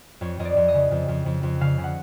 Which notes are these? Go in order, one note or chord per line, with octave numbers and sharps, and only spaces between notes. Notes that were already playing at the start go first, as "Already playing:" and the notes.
F2 C#5
F2 D#5
D5
F2
D#5
C#3
F2
F2
F2
F2
C#3 F5
C#3
F#5